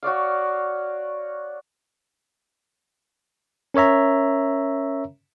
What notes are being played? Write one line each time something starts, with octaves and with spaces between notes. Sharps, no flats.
F#4 C#5 D5 F5
C#4 A#4 C#5 E5 A#5